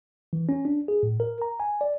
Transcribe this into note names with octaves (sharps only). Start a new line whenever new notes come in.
E3
C#4
D4
G#4
A2
A#4
A#5
G#5
D5